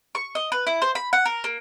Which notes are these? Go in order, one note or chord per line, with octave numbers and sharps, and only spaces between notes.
C#6
D#5
B4
E4
C5
B5
F#5
A#4
A#3